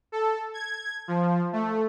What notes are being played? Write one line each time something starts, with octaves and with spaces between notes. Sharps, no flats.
A4
G#6
F3
A3